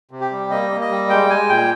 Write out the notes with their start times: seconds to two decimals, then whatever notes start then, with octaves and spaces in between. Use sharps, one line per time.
0.11 C3
0.21 G4
0.31 G3
0.50 A#3 D#5
0.70 A#3
0.81 D#5
0.90 G3
1.09 G#3 G5
1.30 G#3 G#5
1.49 A#2 G5